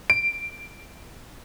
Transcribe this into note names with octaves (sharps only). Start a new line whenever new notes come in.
D7